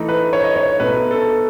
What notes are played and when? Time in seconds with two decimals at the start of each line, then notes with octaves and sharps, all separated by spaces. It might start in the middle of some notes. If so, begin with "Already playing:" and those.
Already playing: E3 A3 D#4
0.09 B4
0.33 C#5
0.44 D#5
0.56 C#5
0.80 B2 A3 D#4 B4
1.11 A4